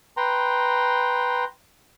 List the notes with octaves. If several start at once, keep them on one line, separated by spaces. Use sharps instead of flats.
B4 G5 A#5 C6